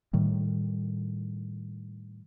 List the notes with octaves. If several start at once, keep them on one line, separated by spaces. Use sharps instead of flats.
A2 D#3 G3